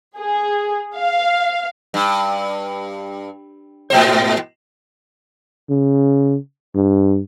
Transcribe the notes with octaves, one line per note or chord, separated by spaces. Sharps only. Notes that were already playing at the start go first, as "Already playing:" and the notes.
G#4
F5
G2
G#2 B2 C5
C#3
G2